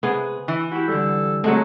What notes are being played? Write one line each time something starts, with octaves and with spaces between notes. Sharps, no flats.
C3 B3 G#4
E3
E4 F#4 G4
D3 G3 A4
F#3 G#3 A3 C4 F#5